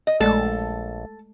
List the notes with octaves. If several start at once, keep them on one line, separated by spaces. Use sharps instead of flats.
D#5
A#1 G#3 A3 A4 D5